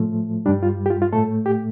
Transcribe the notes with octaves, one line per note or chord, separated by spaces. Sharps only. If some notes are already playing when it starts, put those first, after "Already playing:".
Already playing: A2 F3 A3
G2 G3 D4
F4
G4
F4
F4
A2 A3 A4
G4